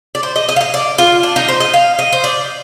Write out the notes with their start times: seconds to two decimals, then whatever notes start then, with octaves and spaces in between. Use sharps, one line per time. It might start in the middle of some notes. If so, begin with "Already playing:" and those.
0.15 D5
0.23 C5
0.36 D#5
0.49 D#5
0.56 F5
0.61 D#5
0.74 D5
0.98 F4
1.23 D4
1.36 D#4
1.48 C5
1.60 D#5
1.74 F5
1.99 D#5
2.12 C5
2.24 D5